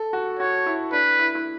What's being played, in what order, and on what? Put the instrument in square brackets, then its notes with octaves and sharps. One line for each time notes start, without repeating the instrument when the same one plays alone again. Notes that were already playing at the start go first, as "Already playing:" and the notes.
Already playing: [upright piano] A4
F#4
[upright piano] F#4 [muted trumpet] C#5
[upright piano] E4
[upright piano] D4 [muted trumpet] B4
[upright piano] E4
E4